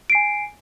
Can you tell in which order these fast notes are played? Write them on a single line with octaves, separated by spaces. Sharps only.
D7 C7 G#5